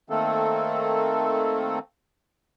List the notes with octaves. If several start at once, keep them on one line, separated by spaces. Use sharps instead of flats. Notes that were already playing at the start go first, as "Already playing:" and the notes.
D#3 A3 A#3 C4 A4